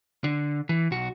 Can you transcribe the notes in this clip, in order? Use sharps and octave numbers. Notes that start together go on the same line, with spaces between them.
D3
E3
B1 F#4